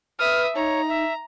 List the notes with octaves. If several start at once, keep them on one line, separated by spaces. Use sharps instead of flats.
B4 E5 D#6 F6
D#4 C#5 A#5
E5